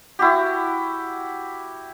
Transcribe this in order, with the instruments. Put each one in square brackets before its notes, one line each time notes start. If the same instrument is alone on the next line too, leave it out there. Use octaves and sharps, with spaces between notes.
[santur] E4 F#4 G4